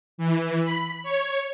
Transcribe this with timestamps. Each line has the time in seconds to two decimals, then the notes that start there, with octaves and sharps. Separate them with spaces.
0.18 E3
0.61 B5
1.03 C#5